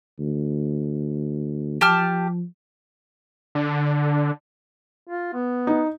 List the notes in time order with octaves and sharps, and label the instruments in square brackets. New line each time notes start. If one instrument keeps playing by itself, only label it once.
[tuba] D2
[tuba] F3 [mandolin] G4 A5 F6
[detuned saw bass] D3
[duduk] F4
B3
[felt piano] D#4